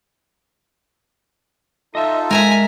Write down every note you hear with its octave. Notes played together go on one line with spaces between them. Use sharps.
D#4 F4 A4 D#5 E5
G#3 A#4 E5 G#5 A#5